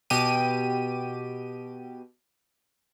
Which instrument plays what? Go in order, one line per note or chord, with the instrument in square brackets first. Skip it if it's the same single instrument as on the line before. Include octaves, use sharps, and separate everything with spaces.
[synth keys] B2 G4 D#7